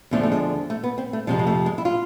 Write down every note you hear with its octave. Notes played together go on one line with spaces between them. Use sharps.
E2 D3 F3 A3
A3
G#3
A3
B3
C4
A3
F2 C3 F3 G#3
G#3
A3
G#3
E4
F4